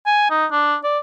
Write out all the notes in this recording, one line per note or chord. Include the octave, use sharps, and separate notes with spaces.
G#5
D#4
D4
D5